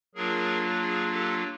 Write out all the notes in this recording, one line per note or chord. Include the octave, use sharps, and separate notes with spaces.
F#3 A#3 D4 F4 G#4 A#4
G#4
G4 A4